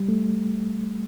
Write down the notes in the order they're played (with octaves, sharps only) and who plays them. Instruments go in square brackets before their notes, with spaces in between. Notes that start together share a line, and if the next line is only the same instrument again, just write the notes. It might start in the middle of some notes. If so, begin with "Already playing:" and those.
Already playing: [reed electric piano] G3
A3